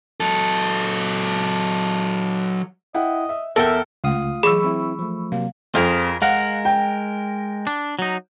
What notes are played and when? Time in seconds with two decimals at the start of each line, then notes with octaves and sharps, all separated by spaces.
0.20 F#3 A4
2.94 E4 D#5 F#5 G5
3.29 E5
3.56 E2 A4 A#4 E5 G5
4.04 C#2 A3 F4 F5 F#5 D#6
4.43 E3 F#3 G#4 B5 C#6 E6
4.64 C4 E4
4.99 F3 A3
5.32 C3 F#3 A#3 F5
5.75 F2 F4 G#4 A#4
6.22 G#3 A#4 F5 F#5
6.65 G5
7.67 D4
7.99 F#3 D#4